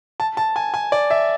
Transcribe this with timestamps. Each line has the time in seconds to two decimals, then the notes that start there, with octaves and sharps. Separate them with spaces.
0.20 A5
0.37 A5
0.56 G#5
0.74 G#5
0.92 D5
1.10 E5